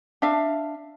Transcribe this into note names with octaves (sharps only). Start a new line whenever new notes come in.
D4 E5 F5